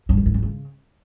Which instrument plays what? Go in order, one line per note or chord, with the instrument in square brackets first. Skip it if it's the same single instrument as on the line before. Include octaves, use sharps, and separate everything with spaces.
[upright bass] G2
F2
A2
G#2
C#3